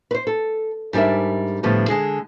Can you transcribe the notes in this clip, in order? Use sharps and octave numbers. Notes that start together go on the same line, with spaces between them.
B4 C5
A4
G#2 G3 D4 A#4 E5
A2 D3 F3 G3 B3
D3 G#3 G#4